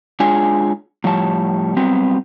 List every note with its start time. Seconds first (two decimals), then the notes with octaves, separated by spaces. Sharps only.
0.20 G#3 D4 F4 G#4 C#5 G#5
1.04 A2 F3 G3 C#5 A5
1.77 F#3 G3 B3 C4 F#4